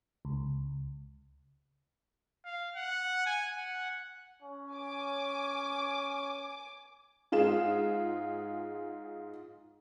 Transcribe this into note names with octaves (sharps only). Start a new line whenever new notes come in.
C#2
F5
F#5
G#5
F#5
C#4
G#5 D6
G#2 F4 G#4 E7